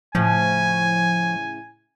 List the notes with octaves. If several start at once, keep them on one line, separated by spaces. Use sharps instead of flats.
A2 C#3 F3 G#5